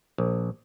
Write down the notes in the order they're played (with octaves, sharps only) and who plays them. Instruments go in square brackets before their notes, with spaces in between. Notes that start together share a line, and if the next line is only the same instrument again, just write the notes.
[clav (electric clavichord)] A#1